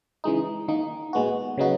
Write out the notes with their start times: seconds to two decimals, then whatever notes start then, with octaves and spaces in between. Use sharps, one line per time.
0.24 C#3 E3 G#3 D#4
0.68 D#3 A#3 D#4
1.13 A#2 G#3 B3 F#4
1.58 C#3 F#3 B3 D#4 F#4